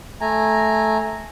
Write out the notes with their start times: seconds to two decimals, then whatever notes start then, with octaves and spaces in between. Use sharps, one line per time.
0.21 A3 G#5 A#5